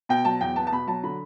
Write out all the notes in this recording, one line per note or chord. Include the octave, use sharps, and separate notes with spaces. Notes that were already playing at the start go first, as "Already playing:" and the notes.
B2 G5
F#3 A5
E2 G5
B3 A5
A5
B2 B5
F#3 A5
D3 B5